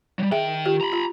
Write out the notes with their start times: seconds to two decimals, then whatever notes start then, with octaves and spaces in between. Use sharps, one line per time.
0.19 F#3 G3
0.32 D#3 G#4 E5 G5
0.66 F4 G4
0.81 A#5 B5
0.93 F4